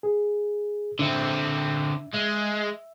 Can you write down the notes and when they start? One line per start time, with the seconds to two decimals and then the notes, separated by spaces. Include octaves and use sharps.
0.03 G#4
0.99 D3 C4 D4 E5
2.14 G#3 E5